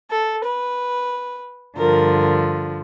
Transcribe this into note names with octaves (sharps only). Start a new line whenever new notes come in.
A4
B4
G2 D3 F3 A#4